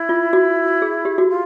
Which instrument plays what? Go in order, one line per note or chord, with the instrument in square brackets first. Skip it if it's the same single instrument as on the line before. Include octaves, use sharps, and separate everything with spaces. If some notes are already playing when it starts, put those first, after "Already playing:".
Already playing: [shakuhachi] E4
[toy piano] F4
F#4
G#4
G4
F#4
[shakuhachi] F4